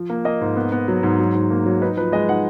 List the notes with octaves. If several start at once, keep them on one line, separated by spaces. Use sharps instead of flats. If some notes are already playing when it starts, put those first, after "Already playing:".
Already playing: F3
A#3
A#3 D#5
G#2
B3
B3
F#3
G#2
F#3
G#2
A#3
F#3
D#4 B4
F3 B4
G#3 D#5
D#4 F#5